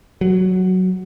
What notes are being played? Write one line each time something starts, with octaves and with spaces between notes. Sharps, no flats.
F#3